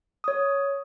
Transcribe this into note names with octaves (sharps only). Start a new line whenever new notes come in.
C#5 D#6